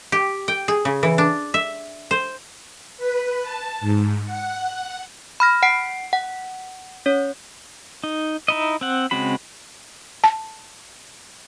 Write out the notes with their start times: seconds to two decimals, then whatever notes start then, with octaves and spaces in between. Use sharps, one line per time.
0.12 G4
0.48 G5
0.68 G#4
0.85 C#3
1.03 E3
1.18 D4
1.54 E5
2.11 C5
2.97 B4
3.42 A5
3.81 G#2
4.25 F#5
4.72 F#5
5.40 B5 F6 A#6
5.63 F#5 C7 D7
6.13 F#5
7.06 C#4 C#5
8.04 D#4
8.48 D#4 E4 D#5
8.81 C4 F#5
9.11 C#3 G#3 C4 F#4 B5
10.24 A5